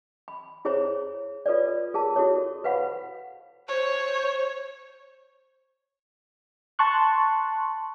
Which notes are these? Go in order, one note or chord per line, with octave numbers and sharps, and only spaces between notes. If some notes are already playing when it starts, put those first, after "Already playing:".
B5
E4 G#4 C5 C#5 A#5
F4 A4 B4 C#5 D5
G#4 A#4 A5
E4 F#4 G#4 A4 C#5
B4 C5 F5 F#5 B5
C5 C#5
A5 C6 C#6 F#6